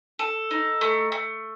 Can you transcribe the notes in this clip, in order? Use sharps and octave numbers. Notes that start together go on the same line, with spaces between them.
A4
D#4
A3
A3